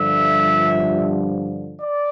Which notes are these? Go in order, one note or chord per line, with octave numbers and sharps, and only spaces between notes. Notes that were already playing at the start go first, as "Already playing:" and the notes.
Already playing: G2 D3 F3 E5
D5